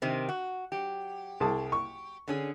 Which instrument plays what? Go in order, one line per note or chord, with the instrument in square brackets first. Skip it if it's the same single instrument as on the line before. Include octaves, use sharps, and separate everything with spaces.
[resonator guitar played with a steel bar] C3 D#3 C4
F#4
F#3 G4
[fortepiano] C2 G#4 A5
C#6
[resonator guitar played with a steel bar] D3 C#4 G#4